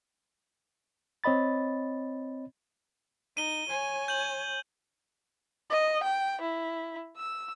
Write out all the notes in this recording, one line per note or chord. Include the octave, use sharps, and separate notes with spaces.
C4 C#5 D#5 B5 A6
D#4 D#7 G7
C#5 G#5
G6 F#7
D#5
G5
E4
E6